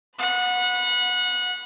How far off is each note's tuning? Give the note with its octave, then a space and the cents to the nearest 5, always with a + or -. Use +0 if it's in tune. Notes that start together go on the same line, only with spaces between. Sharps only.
F#5 -25 B5 +0